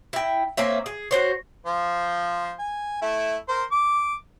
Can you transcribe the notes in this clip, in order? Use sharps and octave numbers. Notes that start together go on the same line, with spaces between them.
E4 G5
A#3 C4 C#4 E5
G#4
F#4 C5 C#5
F3 C5
G#5
A3 E4
A#4 C5
D6